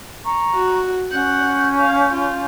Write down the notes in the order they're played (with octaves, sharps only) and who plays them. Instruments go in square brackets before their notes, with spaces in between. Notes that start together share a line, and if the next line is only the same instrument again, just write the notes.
[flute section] A#5 C#6
[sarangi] F#4
[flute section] C#4 G6 [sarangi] F#5
[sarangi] F5
F4